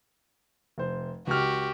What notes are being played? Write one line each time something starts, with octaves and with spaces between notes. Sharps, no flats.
F1 C5
C#2 F#4 G4 F6